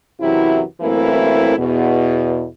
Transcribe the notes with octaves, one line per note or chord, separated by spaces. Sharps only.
F#2 C3 E3 F#3 E4
F#2 E3 A3 A#3 C4 E4
E2 B2